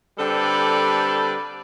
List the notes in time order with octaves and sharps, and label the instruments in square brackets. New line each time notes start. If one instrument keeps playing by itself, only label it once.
[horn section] D3 G3 C4 A4 B4 D5